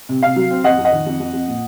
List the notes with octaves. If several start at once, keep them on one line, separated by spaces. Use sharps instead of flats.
C3
C3 F5
F#3
C4
F2 D#5 F#5
F2
D#5 F#5
D#3
F2
F2
F2
A#2